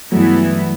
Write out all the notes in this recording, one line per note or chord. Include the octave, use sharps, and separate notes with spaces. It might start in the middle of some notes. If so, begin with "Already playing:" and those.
G2 E3 F#3 A3 B3 E4